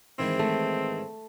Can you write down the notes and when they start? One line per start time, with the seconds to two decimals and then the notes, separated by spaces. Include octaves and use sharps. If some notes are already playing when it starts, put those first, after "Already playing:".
0.19 G#2 D#3 E3 C4
0.39 A3